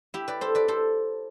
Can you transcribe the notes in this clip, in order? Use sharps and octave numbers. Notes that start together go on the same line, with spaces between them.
E4 G4
B4 D5
A4 C5
B4 D5
A4 C5